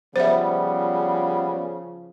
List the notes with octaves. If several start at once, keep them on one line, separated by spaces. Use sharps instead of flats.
C#3 F3 G3 B3 C5 E5